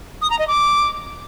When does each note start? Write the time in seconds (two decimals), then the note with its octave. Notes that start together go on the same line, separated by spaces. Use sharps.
0.22 D#6
0.30 A#5
0.39 D#5
0.48 D6